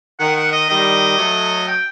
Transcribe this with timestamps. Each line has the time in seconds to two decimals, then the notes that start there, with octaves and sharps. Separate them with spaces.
0.19 D#3 F#5
0.36 F#5
0.52 D#5
0.69 D#3 G3 D#5
1.18 F#3 A3
1.68 G5